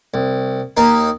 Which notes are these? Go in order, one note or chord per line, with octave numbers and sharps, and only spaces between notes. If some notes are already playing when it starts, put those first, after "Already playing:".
C2
D#2 A#3 D#4